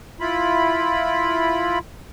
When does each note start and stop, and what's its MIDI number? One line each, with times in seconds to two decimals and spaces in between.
0.20 1.79 64
0.20 1.79 65
0.20 1.79 83